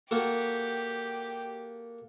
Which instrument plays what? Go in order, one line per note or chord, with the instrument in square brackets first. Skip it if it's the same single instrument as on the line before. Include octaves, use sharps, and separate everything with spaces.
[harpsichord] A#3 F#4 A4 [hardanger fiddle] G4